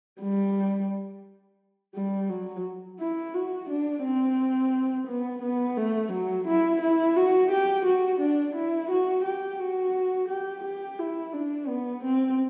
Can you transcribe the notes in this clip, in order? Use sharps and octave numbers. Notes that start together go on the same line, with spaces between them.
G3
G3
F#3
E4
F#4
D4
C4
B3
B3
A3
F#3
E4
E4
F#4
G4
F#4
D4
E4
F#4
G4
F#4
G4
G4
E4
D4
B3
C4